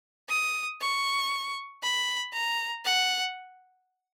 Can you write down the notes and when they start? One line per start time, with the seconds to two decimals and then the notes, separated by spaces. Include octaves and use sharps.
0.29 D#6
0.81 C#6
1.83 B5
2.33 A#5
2.85 F#5